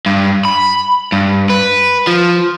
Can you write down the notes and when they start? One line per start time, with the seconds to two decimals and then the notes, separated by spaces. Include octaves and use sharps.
0.06 G2
0.45 B5
1.12 G2
1.50 B4
2.07 F3